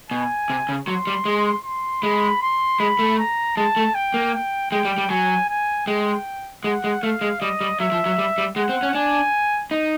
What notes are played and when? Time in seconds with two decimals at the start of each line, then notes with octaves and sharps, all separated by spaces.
0.10 B2 G#5
0.50 C3
0.69 C#3
0.88 F#3 C6
1.07 G3
1.25 G#3
1.65 C6
2.02 G#3 B5
2.42 C6
2.79 G#3 B5
2.99 A3
3.19 A#5
3.57 G#3 A5
3.76 A3
3.95 G5
4.14 A#3
4.34 G5
4.71 G#3 G5
4.85 G3
4.98 G3
5.10 F#3 G#5
5.49 G#5
5.87 G#3 G5
6.64 G#3 F#5
6.84 G#3
7.03 A3 F5
7.21 G#3
7.41 G3 D#5
7.61 G3
7.80 F#3 E5
7.92 F3
8.06 F#3
8.18 G3
8.38 G3
8.56 G#3 F#5
8.69 C4
8.83 C#4
8.95 D4 G#5
9.71 D#4